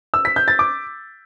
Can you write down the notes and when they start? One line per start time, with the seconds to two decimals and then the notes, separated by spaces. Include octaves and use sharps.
0.14 E6
0.25 B6
0.36 G6
0.48 A6
0.59 D6